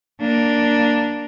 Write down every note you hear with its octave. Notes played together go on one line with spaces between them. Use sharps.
A#3 D4